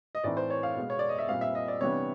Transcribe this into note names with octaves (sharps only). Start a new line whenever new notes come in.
D#5
A2 E3 A3 C4 D#4 D5
C5
C#5
F5
B2 G#3 B3
C#5
D5
D#5
E5
A#2 G3 C4 F5
E5
D#5
D5
C3 E3 G3 B3 D4 C#5